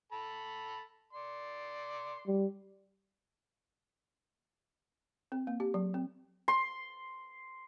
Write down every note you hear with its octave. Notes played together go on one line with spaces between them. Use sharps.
A4 A5 B5
D5 C6
G3
C4
A#3
G4
F#3
C4
C6